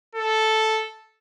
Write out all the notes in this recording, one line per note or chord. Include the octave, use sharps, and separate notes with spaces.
A4